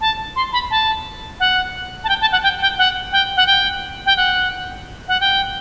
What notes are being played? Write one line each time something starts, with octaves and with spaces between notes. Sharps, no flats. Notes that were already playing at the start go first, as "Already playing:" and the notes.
A5
C6
B5
A5
F#5
A5
G5
A5
F#5
G5
G5
F#5
G5
F#5
G5
G5
F#5
F#5
G5